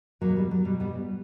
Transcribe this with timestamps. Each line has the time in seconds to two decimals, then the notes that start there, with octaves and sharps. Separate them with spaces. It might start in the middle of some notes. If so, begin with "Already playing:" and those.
0.21 E2 B2 F#3 A#3
0.36 G3
0.51 F#3
0.65 E2 B2 G3
0.80 G3 B3